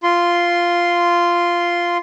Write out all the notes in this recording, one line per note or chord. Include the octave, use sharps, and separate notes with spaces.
F4 C6